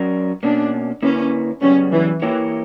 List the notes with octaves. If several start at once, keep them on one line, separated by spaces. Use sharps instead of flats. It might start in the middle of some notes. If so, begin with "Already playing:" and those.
Already playing: F#3 C#4 F#4 A#4 D5
B2 A#3 C#4 D4
D3 A#3 C#4 E4 B4
F#2 C#3 G3 B3 C#4
E3
E3 A#3 E4 G4 A#4 C#5